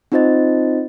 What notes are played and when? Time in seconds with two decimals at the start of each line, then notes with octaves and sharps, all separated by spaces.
0.12 C4 D#4 F4 C5 D#5 A6